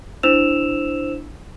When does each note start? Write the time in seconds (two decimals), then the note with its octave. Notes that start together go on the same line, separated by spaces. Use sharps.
0.23 D4 E4 C5 E6 E7 F7